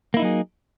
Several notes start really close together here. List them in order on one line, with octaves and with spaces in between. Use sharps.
A#3 E4 D#4 F#3 G#4